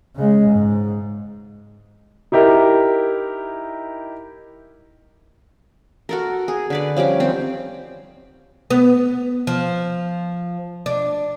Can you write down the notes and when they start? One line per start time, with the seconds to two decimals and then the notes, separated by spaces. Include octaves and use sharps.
0.16 C#3 G#3
0.49 G#2
2.32 D#4 E4 G4 A#4
6.09 F#4 A4 A#4
6.48 G#4
6.70 D3 B4 D5
6.96 F3 G3 C#4 D6
7.20 D#3 C4
8.70 B3
9.47 F3
10.86 D4